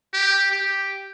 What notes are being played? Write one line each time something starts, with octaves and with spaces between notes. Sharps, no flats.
G4
G4